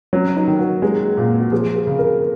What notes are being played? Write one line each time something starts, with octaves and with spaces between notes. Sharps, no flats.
F#3 C#4
D#4
D#3
F#4
G#3 G#4
A#2
F#4
F3 G#4
G#4
C#3
A#4